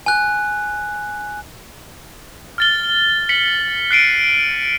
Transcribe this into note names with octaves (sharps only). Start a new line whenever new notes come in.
G#5 F#6
F6 A6 G7
B6 C#7 F#7
F#6 C7 D7 D#7